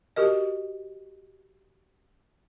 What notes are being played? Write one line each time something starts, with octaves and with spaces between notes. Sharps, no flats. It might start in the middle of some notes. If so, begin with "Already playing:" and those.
F#4 G4 A#4 D#5